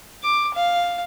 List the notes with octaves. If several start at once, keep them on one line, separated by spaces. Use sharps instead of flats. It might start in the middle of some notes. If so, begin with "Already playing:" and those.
D6
F5